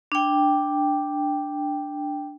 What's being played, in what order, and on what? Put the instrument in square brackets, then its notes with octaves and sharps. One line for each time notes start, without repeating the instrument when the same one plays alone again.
[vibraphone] D4 G5